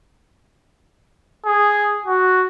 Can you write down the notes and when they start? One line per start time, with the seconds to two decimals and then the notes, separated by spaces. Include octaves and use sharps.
1.46 G#4
2.06 F#4